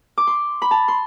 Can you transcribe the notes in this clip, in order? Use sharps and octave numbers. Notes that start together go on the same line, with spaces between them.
D6
C6
B5
A5
C6